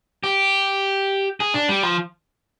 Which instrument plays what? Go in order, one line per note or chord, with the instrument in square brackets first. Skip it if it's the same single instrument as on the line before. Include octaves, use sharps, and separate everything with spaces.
[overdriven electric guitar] G4
G#4
D4
G3
F3